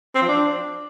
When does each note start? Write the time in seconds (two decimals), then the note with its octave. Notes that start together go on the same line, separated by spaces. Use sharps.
0.15 C4
0.22 F3
0.29 D4